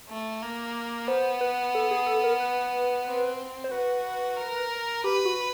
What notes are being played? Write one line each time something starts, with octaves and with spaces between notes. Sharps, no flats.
A3
A#3
B3 C5
B4
A4
G#4
A4
A#4
B4
C4
C5
F#4 B4
A#4
G4 B4
F#4